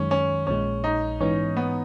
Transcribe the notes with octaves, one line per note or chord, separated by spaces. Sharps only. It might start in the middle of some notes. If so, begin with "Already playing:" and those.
Already playing: F#2 D#3 G#3 C#4
C#4
A#1 A#2 G#3 C#4
D#4
G#2 E3 B3 C#4 D#4
B3